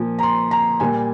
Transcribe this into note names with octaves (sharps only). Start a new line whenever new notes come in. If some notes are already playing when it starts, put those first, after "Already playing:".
Already playing: A#2 F3
A#5
C6
A#5
A#2 G3 G#5